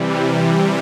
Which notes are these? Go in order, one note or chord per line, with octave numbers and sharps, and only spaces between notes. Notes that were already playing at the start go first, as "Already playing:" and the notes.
Already playing: C3 E3 G3